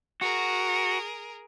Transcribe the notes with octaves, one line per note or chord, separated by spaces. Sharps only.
F#4 G#4 A#4